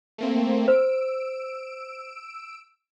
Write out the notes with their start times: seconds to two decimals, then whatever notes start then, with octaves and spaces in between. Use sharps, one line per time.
0.18 A3 A#3 C4
0.68 C5 E6 D7